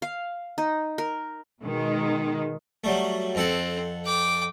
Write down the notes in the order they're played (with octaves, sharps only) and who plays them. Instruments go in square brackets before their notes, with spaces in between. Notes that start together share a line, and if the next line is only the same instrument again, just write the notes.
[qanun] F5
D#4
A#4
[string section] B2 D#3 G#3
[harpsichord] F#3 G3 A3
[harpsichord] F2 A4 F#5 [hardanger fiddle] C4
[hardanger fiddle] G5 D6